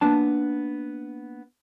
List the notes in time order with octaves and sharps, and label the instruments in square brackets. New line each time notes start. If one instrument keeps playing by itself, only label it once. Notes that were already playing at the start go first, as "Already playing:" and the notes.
[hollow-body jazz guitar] A#3 B3 D4 A5